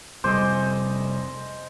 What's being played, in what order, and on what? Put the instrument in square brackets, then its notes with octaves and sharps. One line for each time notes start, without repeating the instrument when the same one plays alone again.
[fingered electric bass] F1 C3 G3 [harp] A4 G#5 D6 [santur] C5 D#5